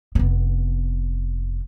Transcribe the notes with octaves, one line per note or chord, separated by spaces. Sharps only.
F1 B3